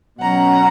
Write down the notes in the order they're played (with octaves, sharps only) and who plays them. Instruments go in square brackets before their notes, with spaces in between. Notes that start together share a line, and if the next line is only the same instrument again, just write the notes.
[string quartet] B2 F#3 C#4 F#5 A#5